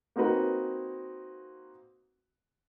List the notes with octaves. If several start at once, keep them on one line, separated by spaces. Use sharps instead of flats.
A#3 C4 D#4 F#4 B4